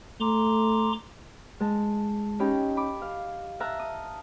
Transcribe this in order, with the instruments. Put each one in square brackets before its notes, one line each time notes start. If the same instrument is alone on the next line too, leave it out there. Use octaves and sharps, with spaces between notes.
[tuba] A3 [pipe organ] A#5 C6 D6
[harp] G#3 A5
C#4 D#4 G4 B5
B5 D6
F5
E5 A5 A#5 F6 F#6
D#6